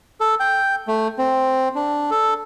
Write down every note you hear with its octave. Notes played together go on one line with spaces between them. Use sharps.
A4
G5
A3
C4
D4
A4